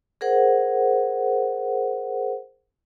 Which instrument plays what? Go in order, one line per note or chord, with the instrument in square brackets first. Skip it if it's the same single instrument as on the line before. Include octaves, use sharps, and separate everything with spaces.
[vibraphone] G#4 A#4 C5 F#5